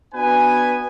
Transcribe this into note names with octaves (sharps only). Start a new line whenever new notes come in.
B3 D4 F#4 B4 G#5